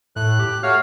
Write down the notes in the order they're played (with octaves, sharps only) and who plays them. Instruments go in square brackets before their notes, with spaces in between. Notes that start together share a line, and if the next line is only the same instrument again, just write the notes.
[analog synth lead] A2 [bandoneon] F#6
[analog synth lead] G4
[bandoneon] A3 F#4 C#5 [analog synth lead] F5